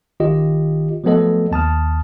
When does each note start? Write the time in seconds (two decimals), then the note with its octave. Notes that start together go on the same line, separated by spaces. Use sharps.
0.20 A#1 D#3 F4 G4 D#5
1.04 F3 F#3 A3 B3 A4 D#5
1.51 D#2 A5 D#6 F6